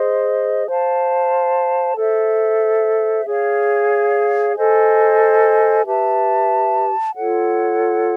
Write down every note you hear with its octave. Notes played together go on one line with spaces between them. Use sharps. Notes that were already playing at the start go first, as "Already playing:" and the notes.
Already playing: G#4 C5 D#5
C5 F5 A5
A4 C5 E5
G#4 C#5 F5
A4 C5 D#5 G#5
G4 B4 E5 A5
F4 A4 C#5 F#5